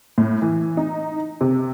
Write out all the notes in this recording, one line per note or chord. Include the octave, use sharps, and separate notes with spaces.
A2
E3
D#4
C3